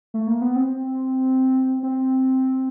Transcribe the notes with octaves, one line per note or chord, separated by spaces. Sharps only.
A3
A#3
B3
C4
C4